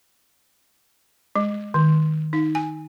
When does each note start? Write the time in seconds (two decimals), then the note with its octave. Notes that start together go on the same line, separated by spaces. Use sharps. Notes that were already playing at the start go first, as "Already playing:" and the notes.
1.36 G#3
1.74 D#3
2.33 D#4
2.55 G#5